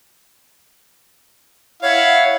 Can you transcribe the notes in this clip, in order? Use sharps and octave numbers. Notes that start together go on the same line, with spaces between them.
E4 C#5 F5 F#5